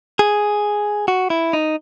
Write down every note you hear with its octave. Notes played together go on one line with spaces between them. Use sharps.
G#4
F#4
E4
D#4